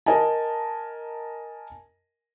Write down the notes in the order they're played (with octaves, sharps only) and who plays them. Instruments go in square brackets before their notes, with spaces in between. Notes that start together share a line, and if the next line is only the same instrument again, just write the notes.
[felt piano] A#4 D#5 G#5 A5